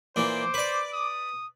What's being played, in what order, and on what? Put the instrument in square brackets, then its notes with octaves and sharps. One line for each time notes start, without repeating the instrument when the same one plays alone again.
[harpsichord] A#2 E3 [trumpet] C5 [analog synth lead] D6
[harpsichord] B4 D5
[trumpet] D#6